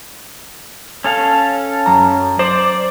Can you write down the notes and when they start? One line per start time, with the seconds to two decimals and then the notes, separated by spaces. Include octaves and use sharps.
1.04 C#4 A4 F5
1.86 F#2 A#5
2.39 C5 D5